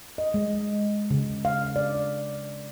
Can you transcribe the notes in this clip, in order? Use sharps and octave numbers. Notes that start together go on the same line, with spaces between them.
D#5
G#3
C#3
F5
D5